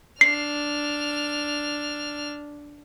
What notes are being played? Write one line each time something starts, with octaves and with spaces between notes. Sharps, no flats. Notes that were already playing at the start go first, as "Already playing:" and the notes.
D4 F6 C7